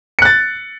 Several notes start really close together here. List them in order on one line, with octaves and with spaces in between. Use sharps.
C#7 F#6 A6